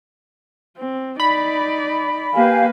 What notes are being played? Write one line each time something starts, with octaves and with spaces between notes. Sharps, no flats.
C4
D#4 D5 B5
A#3 G4 B4 F5 G#5